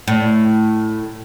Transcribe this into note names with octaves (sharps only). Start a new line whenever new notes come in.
A2